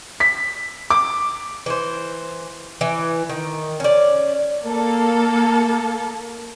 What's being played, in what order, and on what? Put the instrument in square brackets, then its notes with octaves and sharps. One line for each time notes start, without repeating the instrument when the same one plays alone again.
[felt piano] B6
D6
[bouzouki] E3 C5
E3
D#3
C#4 D5
[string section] A#3 A4